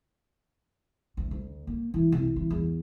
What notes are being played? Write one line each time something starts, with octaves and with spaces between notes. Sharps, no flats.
D2
D2
A#3
E3
C2
E3
E2